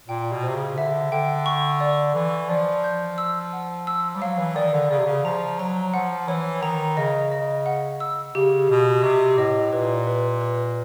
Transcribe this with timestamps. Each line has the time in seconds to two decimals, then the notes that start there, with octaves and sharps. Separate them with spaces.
0.08 A#2 G5
0.32 B2
0.43 C5
0.49 C3
0.55 C#3
0.77 D3 E5
1.12 D3 G5
1.46 C#6
1.80 D5
2.15 E3 C#6
2.50 F3 D5
2.84 G6
3.18 E6
3.53 F#5
3.87 E6
4.16 G3
4.22 F#3 F5
4.39 E3
4.56 D#3 D5
4.73 D3
4.90 C#3 D5
4.99 C3
5.06 C#3
5.25 F3 A#5
5.59 F#3 A#5
5.94 F3 F#5
6.28 E3 C#5
6.63 D#3 A#5
6.97 C#3 D#5
7.32 D#5
7.66 F#5
8.00 E6
8.34 C#3 G4
8.69 B2 G4
9.03 C3 G4
9.38 A2 D#5
9.73 A#2 B4
10.07 B4
10.41 B4